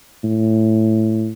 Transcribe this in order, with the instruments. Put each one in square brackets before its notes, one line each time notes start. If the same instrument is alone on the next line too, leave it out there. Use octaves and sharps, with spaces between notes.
[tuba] A2